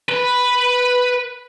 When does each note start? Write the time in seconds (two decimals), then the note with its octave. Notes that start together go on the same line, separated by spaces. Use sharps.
0.09 B4